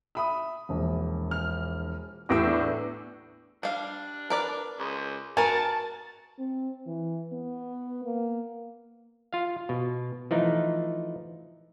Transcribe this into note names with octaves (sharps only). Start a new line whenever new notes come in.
E5 B5 D#6
E1 A#1
F6
E2 A2 D6 E6 A#6 D7
B3 D4
G3 D4 F5
A#4 B4 D5
C#2
F#4 A#4 B4 G#5 A5
C4
E3
B3
A#3
F4 F5
B2
E3 F3 A3 D#4